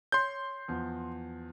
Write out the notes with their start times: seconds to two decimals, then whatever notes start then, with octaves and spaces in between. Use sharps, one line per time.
0.12 C#5 C6 G6
0.68 E2 F3